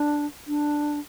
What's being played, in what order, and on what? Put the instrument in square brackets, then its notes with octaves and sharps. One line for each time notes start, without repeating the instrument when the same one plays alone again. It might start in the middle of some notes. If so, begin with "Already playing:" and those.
Already playing: [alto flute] D4
D4